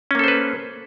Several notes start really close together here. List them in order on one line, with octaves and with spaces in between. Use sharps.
C#4 A#3 A4 C5 B4